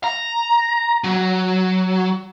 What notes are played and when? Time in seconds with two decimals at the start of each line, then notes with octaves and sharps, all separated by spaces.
0.04 A#5
1.04 F#3